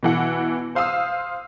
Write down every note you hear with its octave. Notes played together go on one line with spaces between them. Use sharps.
B2 E3 F#5
C5 F5 D#6 E6